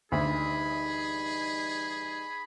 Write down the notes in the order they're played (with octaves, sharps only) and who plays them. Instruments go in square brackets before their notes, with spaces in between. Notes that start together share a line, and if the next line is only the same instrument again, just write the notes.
[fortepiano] D2 [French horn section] E3 G3 D#4 [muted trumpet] G#4 [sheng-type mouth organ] B5